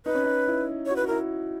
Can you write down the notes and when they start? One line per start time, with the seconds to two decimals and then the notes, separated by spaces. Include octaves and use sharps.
0.05 D#4 B4
0.14 C#4
0.24 D#4
0.48 E4
0.86 F#4 C#5
0.96 B4
1.02 F#4
1.07 E4 A#4